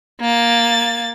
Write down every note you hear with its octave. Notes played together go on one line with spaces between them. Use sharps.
A#3 A6